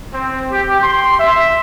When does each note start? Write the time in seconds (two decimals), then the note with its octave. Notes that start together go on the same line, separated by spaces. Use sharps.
0.14 C4
0.52 G4
0.82 C6
1.19 E5